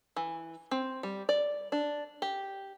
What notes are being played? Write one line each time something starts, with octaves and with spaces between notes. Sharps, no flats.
E3
C4
G3
D5
D4
G4